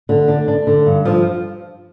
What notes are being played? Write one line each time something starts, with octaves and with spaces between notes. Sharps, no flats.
D3
D4
D4
D3
G2
F3